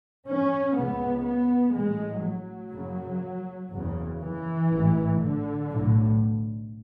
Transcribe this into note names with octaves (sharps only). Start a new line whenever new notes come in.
C#4
C#2 C#3 B3
B3
A1 A2 G#3
F#3
F#1 F#2 C#3
F#1 E2 C#3
E3
A1 G#2
D3
B1 A2